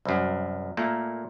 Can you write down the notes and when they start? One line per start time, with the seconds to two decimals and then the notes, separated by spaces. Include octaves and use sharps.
0.05 C2 F#2
0.77 A#2 A3 A#3